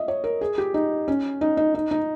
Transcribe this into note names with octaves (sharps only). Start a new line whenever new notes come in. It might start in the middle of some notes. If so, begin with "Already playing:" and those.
Already playing: D#5 E5
C#5
A#4
G#4
G4
D#4
C#4
D#4
D#4
D#4
D#4